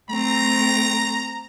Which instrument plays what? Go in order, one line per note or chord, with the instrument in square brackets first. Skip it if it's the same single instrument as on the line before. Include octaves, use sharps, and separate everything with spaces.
[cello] A3 C4 [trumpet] A#5